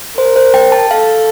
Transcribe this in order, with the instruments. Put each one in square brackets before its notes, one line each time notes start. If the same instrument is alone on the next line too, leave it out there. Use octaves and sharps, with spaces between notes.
[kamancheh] A#4 [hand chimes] C5
[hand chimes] C5
G5
A5
[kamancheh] A4 [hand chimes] F5